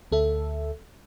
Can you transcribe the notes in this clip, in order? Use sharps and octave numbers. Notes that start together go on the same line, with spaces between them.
D2 A4 E5